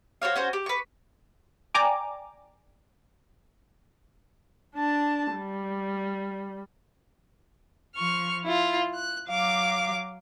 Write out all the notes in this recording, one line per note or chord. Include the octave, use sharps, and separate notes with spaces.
F#4 C5 C#5 F5
C#4 F#4 C5
G4
B4 C#6
D5 G5 G#5 A#5 D6
D4 A5
G3
F3 C#6 F6
E4 F4
F#6
F#3 F5 D6